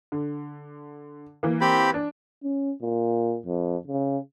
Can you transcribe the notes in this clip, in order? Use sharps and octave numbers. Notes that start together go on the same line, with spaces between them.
D3
E3 A#3
C4 G4 B5
D4
C#4
A#2
F2
C#3